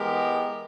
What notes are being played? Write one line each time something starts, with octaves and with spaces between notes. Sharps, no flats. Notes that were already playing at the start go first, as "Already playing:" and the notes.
Already playing: E3 G#3 B3 G4 A#4